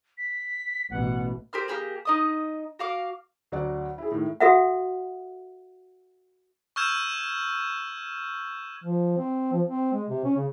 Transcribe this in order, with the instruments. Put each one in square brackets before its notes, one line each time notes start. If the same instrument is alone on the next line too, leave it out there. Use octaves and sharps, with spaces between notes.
[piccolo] B6
[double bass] A1 B2 [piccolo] F#5
[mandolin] G4 A#4 C5 F6
A#3 E4 G4 G#4
D#4 D#5 D#6
F#4 F5 D6
[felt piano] D2 F#3 D5 F#5
E4 G#4
A2 D#3 A3
[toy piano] F#4 A4 E5 F#5
[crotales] C#6 E6 F6 G6 G#6 E7
[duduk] F3
C4
F3
C4
G#3
C3
C#4
C#3